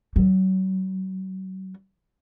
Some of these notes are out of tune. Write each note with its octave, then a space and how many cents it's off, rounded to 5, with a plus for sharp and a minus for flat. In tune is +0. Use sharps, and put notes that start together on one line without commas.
F#3 +35